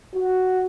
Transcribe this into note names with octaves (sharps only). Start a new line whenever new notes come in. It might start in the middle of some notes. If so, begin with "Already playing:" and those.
F#4